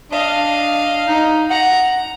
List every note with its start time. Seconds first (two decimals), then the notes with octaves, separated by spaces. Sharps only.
0.11 D4 D#5 F5
1.08 D#4
1.51 F#5 A#5